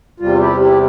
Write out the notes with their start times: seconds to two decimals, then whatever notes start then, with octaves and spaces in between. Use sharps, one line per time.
0.20 E2 C3 G3 F4
0.40 E4 G4
0.60 E4 G4